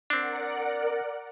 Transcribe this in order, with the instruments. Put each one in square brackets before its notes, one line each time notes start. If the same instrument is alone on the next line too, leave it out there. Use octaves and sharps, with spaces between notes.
[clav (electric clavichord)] C4 D4 [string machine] A#4 D5 F#5